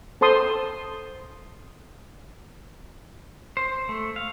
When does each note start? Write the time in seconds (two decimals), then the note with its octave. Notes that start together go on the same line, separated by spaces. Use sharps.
0.21 A4 C5 A5 C6 D#6
3.57 C5
3.89 A3
4.16 F5